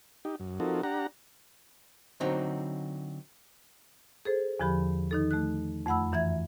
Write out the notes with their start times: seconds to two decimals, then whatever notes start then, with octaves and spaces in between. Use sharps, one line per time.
0.25 D#4 G4
0.40 F#2
0.60 F3 C4 D#4 F#4 A4 A#4
0.83 D4 G4 F#5 A#5
2.20 D3 F#3 C4 D#4
4.25 G#4 A4 C5
4.60 E2 D3 F3 G4 B5
5.11 D#3 D#4 A4
5.31 A3 F#6
5.86 F2 A3 F#5 B5 E6
6.12 F#2 E3 E5 G#6